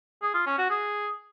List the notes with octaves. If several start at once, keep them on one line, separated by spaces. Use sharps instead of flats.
G#4
F4
C#4
F#4
G#4